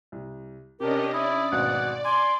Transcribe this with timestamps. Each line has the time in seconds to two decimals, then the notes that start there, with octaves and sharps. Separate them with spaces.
0.12 C2
0.80 C3 C#4 D4 G4 A#4 D#5 A5
1.13 E4 D5 D#6
1.52 G#1 D2 B2 F#5
2.05 G#5 C6 D6